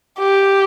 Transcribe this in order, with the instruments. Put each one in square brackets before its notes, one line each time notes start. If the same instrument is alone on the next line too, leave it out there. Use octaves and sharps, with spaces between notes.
[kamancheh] G4